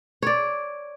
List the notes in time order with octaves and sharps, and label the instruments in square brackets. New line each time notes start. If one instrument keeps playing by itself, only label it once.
[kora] C#5 D5